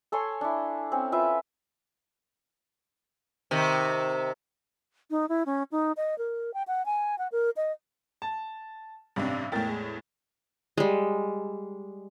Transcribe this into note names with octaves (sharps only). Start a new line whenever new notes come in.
A4 C#5 G#5 C6
D4 E4
C4 C#4
F4 B4 E5
C3 D#3
D#4
E4
C#4
D#4
D#5
A#4
G5
F#5
G#5
F#5
A#4
D#5
A5
A1 G2 C3 D4
E2 A2 A#4 G5 A6
G#3
G3 G#3